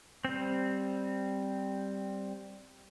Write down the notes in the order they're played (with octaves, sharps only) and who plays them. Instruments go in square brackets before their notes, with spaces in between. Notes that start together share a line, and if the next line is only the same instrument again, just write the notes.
[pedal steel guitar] G3 C4